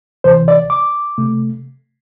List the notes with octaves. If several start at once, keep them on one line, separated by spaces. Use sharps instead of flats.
D2 C3 E3 C5
D5
D6
C3 A3